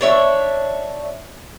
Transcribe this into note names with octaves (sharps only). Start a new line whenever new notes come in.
D4 C#5 E5